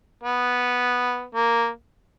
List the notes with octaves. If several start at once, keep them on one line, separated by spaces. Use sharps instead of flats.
B3
A#3